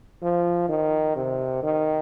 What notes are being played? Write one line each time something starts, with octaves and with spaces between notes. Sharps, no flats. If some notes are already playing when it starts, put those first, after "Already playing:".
F3
D#3
C3
D#3